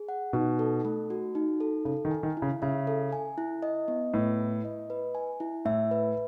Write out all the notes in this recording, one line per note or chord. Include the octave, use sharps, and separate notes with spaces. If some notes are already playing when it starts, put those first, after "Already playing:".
Already playing: G#4
F#5
B2 D#4
A4
A3
F#4
D#4
A4
C#3 A4
D#3
G#5
D#3
E4
C#3
C#3 E5
A4
G#5
E4
D#5
B3
A2 B4
E4
D#5
B4
G#5
E4
A2 E5
B4